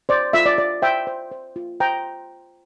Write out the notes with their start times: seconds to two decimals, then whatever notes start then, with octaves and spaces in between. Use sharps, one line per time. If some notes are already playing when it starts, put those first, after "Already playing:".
0.09 C5 D5
0.33 F4 E5
0.46 D5
0.58 F4 D5
0.82 C5 E5 G5
1.07 C5
1.32 C5
1.56 F4
1.80 C5 G5 A#5